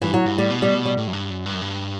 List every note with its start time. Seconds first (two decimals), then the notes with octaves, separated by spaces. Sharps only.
0.02 G2 E3
0.14 F#3
0.26 G2
0.38 A2 G3
0.50 B2
0.62 G3
0.85 G3
0.97 A2
1.07 F#2
1.13 G2
1.30 F#2
1.46 G2
1.54 F#2
1.62 G2